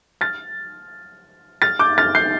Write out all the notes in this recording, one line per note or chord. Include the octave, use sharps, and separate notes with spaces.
F6 A6
F6 A6
D6 G6
F6 A6
G6 C7